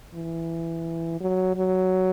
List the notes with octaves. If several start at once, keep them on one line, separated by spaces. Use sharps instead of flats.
E3
F#3
F#3